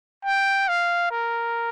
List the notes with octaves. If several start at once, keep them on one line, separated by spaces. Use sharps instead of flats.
G5
F5
A#4